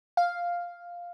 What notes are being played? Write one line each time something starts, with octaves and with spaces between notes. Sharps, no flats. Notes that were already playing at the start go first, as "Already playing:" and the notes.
F5